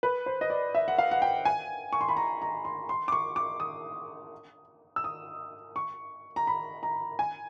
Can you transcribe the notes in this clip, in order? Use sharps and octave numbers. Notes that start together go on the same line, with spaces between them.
B4
C5
D#5
D5
E5
F#5
F5
F#5
G5
G#5
C#6
C6
B5
A#5
A#5
C6
C6
D6
C#6
D6
D#6
E6
D#6
C#6
A#5
B5
A#5
G#5